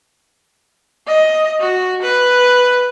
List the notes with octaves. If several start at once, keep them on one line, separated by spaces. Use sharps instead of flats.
D#5
F#4
B4